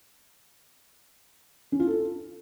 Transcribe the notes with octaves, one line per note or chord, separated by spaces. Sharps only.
C#4
F4
A4